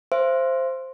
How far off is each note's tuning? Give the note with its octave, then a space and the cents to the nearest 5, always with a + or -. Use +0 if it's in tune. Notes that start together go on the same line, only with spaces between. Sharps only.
C5 +0 E5 +45